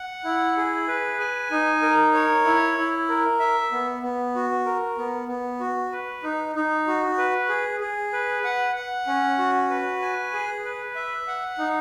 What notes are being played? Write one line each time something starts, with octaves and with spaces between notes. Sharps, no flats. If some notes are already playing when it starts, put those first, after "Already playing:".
Already playing: F#5
E4
G#4
B4
G#5
D#4
A#4
C#5
E4
E4
A#4
E5
B3
B3
F#4
A#4
B3
B3
F#4
B4
D#4
D#4
F#4
B4
G#4
G#4
B4
F#5
F#5
C#4
F#4
B4
G#5
G#4
B4
E5
F#5
D#4